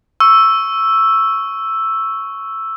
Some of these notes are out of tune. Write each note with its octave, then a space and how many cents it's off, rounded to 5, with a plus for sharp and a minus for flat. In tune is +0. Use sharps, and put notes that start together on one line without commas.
C#6 +0 E6 +0